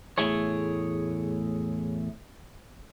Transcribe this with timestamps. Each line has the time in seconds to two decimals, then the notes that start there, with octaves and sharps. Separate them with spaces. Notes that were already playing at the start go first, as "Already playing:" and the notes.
0.18 E2 A2 A3 E4 G#4 C#5